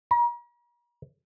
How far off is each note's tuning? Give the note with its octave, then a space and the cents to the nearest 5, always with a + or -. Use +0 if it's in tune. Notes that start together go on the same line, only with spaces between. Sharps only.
A#5 +40